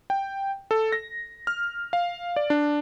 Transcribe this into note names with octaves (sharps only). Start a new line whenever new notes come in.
G5
A4
A#6
F6
F5
D5
D4